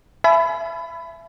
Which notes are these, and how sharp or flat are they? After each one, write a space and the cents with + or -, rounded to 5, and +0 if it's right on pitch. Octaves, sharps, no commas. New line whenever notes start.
E5 +25 G#5 +40 B5 +20